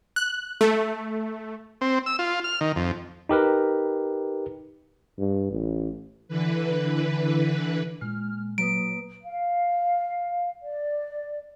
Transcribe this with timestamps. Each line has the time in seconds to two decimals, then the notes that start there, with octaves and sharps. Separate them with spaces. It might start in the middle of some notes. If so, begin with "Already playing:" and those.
0.16 F#6
0.61 A3
1.81 C4
2.06 E6
2.19 F4
2.44 F6
2.61 D#3
2.76 F2
3.29 D#4 G4 A#4 B4
5.19 G2
5.51 A1
6.28 D3 E3 B4
8.01 A#2 G#3 F6
8.58 F#3 A#3 B4 D#6 D7
9.22 F5
10.62 D5